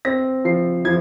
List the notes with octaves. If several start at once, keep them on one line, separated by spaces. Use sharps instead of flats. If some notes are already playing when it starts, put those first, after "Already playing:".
C4 A#6
F3 C7
F3 G#6